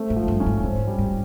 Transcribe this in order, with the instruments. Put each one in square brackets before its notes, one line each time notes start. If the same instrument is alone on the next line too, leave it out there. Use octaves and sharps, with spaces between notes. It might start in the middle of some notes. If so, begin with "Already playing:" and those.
Already playing: [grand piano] A3 C4
[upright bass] G#2
[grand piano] F3
[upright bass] G2
[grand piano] C#4
[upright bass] G#2
[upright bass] G#2 [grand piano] C4
[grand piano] G3
[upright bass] G#2